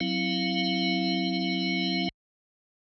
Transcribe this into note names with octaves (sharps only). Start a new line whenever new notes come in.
F#3 C4 E4 F5